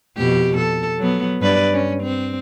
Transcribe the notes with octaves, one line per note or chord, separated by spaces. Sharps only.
F2 B2 G4
A4
F#3 B3
G2 B4 D5
C#4
C4